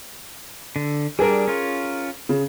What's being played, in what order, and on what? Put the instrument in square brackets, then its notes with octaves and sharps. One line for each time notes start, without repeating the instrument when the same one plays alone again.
[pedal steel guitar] D3
[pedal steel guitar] G3 D4 [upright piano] G#4 A#4
[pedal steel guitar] C#4 F4
[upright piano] C#3